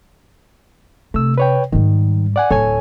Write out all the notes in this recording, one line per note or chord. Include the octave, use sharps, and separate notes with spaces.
C3 A3 E6
B4 C#5 G5
G#2 D#3 G3
D5 F#5 G#5
D1 A4 C#5 G#5